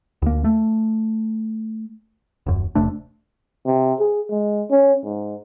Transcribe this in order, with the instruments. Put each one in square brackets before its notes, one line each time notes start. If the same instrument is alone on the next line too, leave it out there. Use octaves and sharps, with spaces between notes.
[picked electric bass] D2 A#3
A3
D#1 F#2
E1 C3 A3 D4
[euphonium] C3
G#4
G#3
C#4
G#2